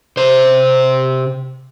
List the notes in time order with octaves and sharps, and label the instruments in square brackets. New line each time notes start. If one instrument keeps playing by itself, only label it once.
[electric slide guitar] C3 C5